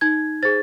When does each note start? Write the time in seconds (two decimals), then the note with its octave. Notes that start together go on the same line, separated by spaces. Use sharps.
0.01 D#4 G#6
0.43 G#4 C5 A6